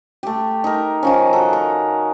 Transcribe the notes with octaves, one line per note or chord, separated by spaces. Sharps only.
A3 G4
D#4 A#4
D#3 F3 C#4
F#4 A4
A#4